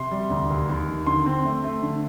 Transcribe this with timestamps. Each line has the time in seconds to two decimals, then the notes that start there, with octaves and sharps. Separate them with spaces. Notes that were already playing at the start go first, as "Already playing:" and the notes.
Already playing: C3 C6
0.11 G3
0.30 D2
0.50 D#2
0.69 D#2
0.88 D#3
1.07 D3 C6
1.26 C4
1.45 A3
1.64 A3
1.83 D3